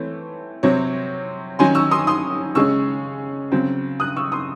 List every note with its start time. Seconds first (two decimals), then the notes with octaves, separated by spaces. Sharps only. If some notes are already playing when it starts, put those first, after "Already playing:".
Already playing: E3 A3 C4 C#5
0.63 C3 F#3 C4 C#5
1.59 D#3 F#3 C#4 G#5 C6
1.75 C#6 E6
1.91 C6 D#6
2.07 C6 D#6
2.55 C#3 G#3 C#4 C#6 E6
3.52 C#3 F#3 C4
4.00 D#6 F#6
4.16 C#6 E6
4.32 C6 D#6